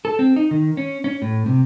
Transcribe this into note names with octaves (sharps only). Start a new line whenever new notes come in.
A4
C4
D#4
D#3
C#4
C#4
A2
C3